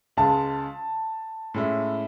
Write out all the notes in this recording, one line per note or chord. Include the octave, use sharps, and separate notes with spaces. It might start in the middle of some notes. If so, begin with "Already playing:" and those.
C#2 C#3 G#3 A5
A2 G#3 C#4 E4